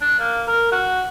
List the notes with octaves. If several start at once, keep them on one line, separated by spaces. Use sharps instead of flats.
D4
A#3
A#4
F#4